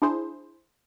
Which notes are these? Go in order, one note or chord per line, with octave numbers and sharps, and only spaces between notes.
D4 E4 G#4 C5